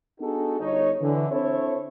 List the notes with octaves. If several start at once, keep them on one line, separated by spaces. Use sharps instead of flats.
B3 D4 D#4 F#4 G#4 A4
G1 D#4 C#5
D3 E3
C4 D4 E4 A4 C5 C#5